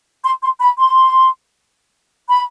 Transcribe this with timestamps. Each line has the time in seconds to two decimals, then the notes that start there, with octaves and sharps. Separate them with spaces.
0.25 C6
0.42 C6
0.61 B5
0.79 C6
2.29 B5